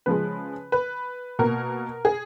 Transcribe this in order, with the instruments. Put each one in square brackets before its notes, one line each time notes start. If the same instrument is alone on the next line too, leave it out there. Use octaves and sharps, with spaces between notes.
[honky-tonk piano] C#3 F3 G#3 B4
B4
B2 A#3 A#4
G#4